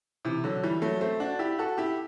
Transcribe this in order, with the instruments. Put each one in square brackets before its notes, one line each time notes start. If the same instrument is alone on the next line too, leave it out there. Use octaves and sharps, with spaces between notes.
[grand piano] C3 E3
D3 F#3
E3 G3
F#3 A3
A3 C4
D4 F#4
E4 G4
F#4 A4
E4 G4